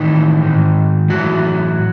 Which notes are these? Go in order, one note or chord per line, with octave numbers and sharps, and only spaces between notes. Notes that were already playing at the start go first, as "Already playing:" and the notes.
Already playing: A2 D#3 E3 D#4
G#2 D#3
A2 E3 F#3 F#4